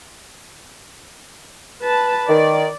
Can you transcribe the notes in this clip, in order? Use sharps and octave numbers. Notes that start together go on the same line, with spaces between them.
B4 A5
D#3 D5